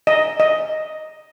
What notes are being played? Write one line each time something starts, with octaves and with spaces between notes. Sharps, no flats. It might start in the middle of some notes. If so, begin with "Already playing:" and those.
D#5
D#5